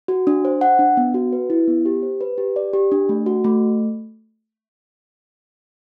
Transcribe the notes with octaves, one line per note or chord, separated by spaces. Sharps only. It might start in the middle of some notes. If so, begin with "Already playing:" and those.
F#4
D4
C5
F#5
D4
B3
F#4
B4
E4
B3
G4
C5
B4
G4
D5
G4
D4
A3
F#4
A3